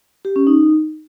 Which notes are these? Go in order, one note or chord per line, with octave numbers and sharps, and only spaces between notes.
G4
C#4
D#4